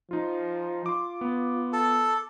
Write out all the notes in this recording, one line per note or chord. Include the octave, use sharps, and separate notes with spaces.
F3 D#4 F4
F4 C6 D6
B3
A4